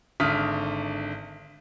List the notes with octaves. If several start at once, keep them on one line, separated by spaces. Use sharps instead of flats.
G#1 D3 E5 D#6 F6 B6